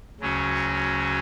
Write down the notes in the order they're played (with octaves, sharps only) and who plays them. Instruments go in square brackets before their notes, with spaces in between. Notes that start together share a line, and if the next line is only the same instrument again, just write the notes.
[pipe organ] D2 C#3 F#3 C#4 F#4